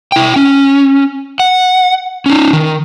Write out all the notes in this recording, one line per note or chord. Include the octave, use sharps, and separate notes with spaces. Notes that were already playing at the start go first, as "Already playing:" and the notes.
E4 G5
C#4
F#5
C#4 D#4
D#3